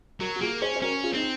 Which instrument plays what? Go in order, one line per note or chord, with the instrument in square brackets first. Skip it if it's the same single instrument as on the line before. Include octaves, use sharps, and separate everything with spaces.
[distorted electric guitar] F#3 [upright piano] F#4 A#4
[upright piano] F#4
[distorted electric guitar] A#3 [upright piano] F4 G#4
[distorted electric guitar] C#4 [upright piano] G#4 C5
[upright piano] C5
[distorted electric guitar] C#4 [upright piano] F#4 A#4
[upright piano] F4 G#4
[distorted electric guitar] C4 [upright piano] D#4